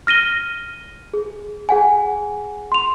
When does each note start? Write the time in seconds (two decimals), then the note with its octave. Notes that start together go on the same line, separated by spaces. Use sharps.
0.07 F6 A#6 D#7 G7
1.14 G#4
1.69 G#4 F#5 G#5
2.72 C6 F7